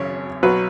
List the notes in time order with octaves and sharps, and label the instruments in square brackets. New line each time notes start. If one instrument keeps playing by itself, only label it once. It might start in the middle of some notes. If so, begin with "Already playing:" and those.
Already playing: [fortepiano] G#1 F#2 C#3 C#5
B1 B2 F#3 B4